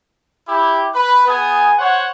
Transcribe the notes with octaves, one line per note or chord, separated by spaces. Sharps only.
E4 G4
B4
B3 G#4 G#5 D#6
C5 C#5 F#5